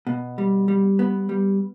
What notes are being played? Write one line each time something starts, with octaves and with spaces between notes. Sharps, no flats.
B2
G3
G3
B3
G3